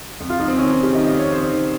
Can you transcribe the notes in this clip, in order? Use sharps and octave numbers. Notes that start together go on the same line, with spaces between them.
F2
F4
F2 D#4
C4
D#3 C#4
D#4
D#3
G4
D#3 D#5
D#5
F2
C#5
F2 C5
D#3